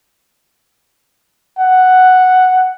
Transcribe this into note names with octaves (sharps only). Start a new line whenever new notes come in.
F#5